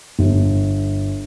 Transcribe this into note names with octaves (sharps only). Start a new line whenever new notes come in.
G1